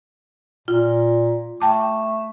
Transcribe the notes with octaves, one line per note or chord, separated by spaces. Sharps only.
A#2 F4
A3 G5 A5 D6